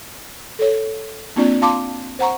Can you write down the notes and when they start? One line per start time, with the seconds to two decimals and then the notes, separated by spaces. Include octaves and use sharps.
0.59 A4 C#5
1.36 A#3 C4 D4 F4 D5
1.61 F4 F5 A5 C6 D6
2.19 C5 F#5 A#5 C#6